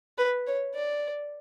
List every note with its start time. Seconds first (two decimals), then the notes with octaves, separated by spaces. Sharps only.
0.18 B4
0.47 C#5
0.75 D5